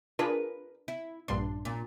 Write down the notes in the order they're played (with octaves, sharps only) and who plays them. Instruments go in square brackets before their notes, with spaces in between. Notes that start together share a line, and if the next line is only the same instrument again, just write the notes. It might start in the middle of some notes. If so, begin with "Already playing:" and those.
[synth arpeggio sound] D4 F4 G#4 [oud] A#4 B4
[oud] E4
[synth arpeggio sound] A#1 G2 C6 [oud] D4
[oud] A#2